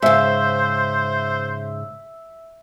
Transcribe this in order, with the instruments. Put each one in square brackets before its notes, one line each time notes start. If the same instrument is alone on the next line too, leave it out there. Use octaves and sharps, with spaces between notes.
[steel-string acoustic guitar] G#2 C#3 [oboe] C5 [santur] E5